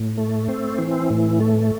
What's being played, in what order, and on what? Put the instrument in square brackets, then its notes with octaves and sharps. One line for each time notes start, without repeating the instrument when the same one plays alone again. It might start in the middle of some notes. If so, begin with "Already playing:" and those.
Already playing: [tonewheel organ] A2
A3
C4
E3
A2
A3